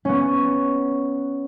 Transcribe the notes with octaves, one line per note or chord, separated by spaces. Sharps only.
B3 C#4